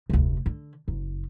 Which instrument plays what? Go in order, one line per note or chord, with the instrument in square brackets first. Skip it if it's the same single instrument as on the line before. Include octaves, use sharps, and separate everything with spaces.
[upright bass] F1 D2
D3
F#1